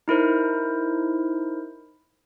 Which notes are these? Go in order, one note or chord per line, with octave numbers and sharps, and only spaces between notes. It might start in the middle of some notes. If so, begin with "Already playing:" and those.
D#4 E4 A#4 C5